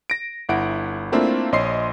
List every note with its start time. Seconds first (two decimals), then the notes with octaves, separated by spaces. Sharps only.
0.10 A#6 D7
0.49 G1 E4 F#5 D7
1.12 A3 A#3 C4 D4 E4 F4
1.52 A#1 C#5 D#5 C6 C7